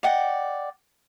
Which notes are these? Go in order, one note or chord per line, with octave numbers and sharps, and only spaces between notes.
D5 D#5 F#5 G5